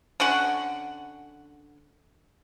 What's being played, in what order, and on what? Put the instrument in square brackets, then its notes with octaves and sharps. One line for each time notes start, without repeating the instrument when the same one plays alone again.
[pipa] D3 C#4 F#4 F#5